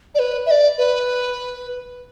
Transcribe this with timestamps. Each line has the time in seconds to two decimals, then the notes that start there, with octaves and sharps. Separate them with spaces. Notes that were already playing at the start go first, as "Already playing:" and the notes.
0.15 D5
0.19 B4
0.46 E5
0.51 D5
0.78 B4